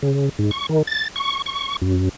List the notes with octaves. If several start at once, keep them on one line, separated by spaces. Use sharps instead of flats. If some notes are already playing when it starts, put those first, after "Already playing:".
C#3
G#2
C#6
D#3
A6
C#6
C#6
F#2